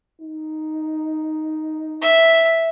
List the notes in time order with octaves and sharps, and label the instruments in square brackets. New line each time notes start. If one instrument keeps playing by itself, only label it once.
[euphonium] D#4
[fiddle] E5